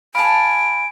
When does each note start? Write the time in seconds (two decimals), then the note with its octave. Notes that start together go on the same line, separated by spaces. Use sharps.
0.15 F5 G#5 A5 B5 D7